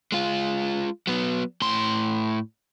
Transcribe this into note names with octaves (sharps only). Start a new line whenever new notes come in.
G#3 F4
F#3 B3
A2 C6